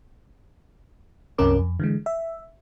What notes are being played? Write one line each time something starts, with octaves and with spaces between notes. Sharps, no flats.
C2 F#2 C3 C#4 A#4 D6
F2
D3 E3 G#3
E5